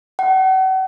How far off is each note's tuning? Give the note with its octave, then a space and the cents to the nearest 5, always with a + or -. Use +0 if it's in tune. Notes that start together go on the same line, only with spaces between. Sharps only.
F#5 +40